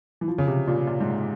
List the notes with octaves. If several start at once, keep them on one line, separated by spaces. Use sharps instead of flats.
E3
F3
C#3
C3
A#2
A#2
G#2